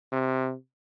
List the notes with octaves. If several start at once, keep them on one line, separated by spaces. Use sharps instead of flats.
C3